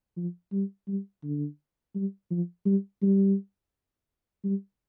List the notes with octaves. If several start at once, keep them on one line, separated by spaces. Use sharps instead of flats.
F3
G3
G3
D3
G3
F3
G3
G3
G3